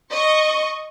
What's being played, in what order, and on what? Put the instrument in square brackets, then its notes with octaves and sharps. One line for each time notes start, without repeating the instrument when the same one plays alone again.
[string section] D#5 C#6